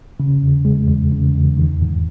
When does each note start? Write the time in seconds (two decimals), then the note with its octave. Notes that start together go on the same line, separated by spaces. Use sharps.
0.20 C#3
0.43 E2
0.65 G#3
0.88 E2
1.12 C#3
1.35 E2
1.57 D#3
1.81 G#2